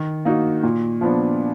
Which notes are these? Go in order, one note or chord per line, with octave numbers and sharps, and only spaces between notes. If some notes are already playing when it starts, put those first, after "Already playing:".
Already playing: D#3
A#3 D#4 F#4
A#2
F3 B3 D4